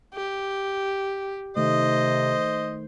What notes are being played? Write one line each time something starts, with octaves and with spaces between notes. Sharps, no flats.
G4
C3 D#3 A3 C5 D#5